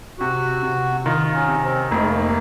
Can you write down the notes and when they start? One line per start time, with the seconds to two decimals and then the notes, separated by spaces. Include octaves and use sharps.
0.19 C3 F#4
0.62 C3
1.05 D#3 F4
1.34 C#4
1.48 C3
1.63 C4
1.91 F1 A#3
1.98 G#3
2.06 A#3